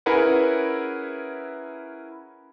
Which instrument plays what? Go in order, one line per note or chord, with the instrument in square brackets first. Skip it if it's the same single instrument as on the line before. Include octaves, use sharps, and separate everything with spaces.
[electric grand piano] C#4 E4 G#4 A#4 B4 F#5